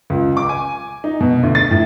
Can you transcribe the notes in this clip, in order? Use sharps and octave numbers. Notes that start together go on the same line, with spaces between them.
C#2
D6
G#5
D#4
B2
D2
A6
A2